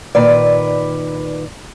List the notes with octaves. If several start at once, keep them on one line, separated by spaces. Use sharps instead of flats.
A#2 D#3 B4 D5